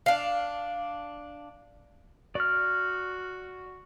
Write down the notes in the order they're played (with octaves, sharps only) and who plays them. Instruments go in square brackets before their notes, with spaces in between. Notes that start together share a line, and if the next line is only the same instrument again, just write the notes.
[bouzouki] D4 F5
[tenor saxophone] F#4 [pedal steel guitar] D5 F6